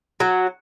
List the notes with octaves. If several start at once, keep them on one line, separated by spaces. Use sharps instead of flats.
F#3